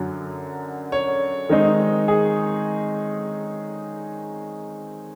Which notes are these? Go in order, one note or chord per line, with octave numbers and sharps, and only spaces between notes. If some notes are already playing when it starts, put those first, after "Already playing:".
Already playing: F#2 D3 F#3
C#5
D#3 G#3 C4 D#4
G#4